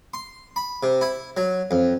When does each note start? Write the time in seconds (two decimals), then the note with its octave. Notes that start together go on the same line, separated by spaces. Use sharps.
0.14 C6
0.56 B5
0.83 C3
1.01 E4
1.37 F#3
1.71 F2